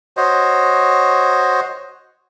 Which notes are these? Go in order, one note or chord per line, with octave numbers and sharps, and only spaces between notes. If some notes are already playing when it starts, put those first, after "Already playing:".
F#4 C5 C#5 D#5